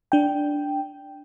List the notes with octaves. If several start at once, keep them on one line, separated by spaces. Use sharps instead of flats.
D4 G5